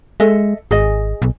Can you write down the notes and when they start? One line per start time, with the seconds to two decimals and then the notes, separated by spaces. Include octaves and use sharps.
0.20 G#3 A4 D#5 E5
0.71 G#1 G#4 D#5
1.22 B1